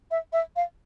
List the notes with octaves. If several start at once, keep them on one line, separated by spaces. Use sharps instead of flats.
E5
E5
F5